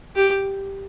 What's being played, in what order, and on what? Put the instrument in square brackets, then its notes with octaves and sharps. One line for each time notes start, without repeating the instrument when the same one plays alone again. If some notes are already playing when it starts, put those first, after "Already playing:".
[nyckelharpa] G4